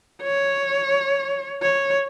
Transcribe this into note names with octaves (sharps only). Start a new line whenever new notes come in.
C#5
C#5